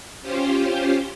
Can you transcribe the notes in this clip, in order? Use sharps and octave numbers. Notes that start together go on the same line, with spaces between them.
C#4 F4 G4 C5